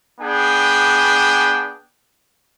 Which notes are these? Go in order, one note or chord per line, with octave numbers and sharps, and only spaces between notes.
B3 D4 G#4 G5